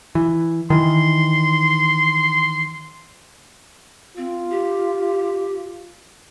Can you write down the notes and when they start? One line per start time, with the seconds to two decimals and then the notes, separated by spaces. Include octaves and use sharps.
0.15 E3
0.70 D#3 E3 C6
4.17 C4 F4
4.50 G4